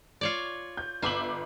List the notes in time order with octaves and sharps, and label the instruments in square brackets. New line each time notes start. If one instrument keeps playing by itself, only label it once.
[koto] F4 C#5 D5
[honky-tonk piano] G6
[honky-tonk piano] G1 D6 F#7 [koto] F4 E5